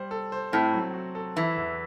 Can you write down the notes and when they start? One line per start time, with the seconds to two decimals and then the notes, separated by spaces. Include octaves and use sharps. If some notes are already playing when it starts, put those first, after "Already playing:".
Already playing: G3 C5
0.11 A4
0.32 C5
0.52 A2 C4
0.73 F#3
0.94 F#4
1.15 A4
1.36 E3 E4
1.57 E2